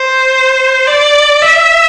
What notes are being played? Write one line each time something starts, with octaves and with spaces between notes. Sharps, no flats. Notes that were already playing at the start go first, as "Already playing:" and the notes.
Already playing: C5
D5
E5